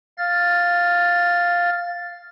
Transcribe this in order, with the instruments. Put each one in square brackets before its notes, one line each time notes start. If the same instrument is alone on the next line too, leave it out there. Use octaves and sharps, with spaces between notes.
[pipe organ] F5 F6 A6